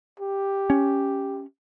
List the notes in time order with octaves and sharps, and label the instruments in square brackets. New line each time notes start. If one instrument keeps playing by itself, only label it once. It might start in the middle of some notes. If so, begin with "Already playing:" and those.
[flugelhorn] G4
[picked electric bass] C#4